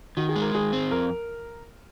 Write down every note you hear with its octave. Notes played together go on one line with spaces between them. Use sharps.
D#3 F#4
G#4
G#3
A#4
D#3 G#4
C4
F2 A#4